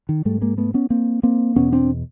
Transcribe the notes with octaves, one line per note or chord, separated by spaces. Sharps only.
D#3
G#2 G3 A3
G#3 A#3
A3 B3
B3 C#4
A#3 C4
A#3 C4
E2 B2 B3 C#4
C4 D4